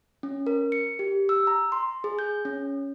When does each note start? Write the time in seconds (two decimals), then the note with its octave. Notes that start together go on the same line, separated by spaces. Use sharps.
0.23 C#4
0.47 A#4
0.72 C#7
0.99 G4
1.29 E6
1.47 A#5
1.72 C6
2.04 G#4
2.19 G6
2.45 C#4